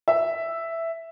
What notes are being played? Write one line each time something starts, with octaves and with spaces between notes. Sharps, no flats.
E5